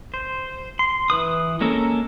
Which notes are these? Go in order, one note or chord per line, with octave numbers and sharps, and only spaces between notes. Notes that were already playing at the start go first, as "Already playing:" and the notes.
C5
C6
E3 B4 D#6
G#3 A#3 C#4 A4 A#4